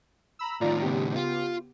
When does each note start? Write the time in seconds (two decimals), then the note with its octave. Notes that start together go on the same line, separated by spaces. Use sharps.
0.39 A#5 B5 E6
0.61 A2 D#3 F4 D5 A#5
0.82 C#3 B3 G4
1.16 F4